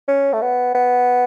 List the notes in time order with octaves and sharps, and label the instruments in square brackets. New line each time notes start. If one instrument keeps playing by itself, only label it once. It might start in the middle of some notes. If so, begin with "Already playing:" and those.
[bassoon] C#4
A3
B3
B3